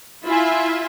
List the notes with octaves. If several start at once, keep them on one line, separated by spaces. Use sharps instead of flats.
E4 F4 E5 G#5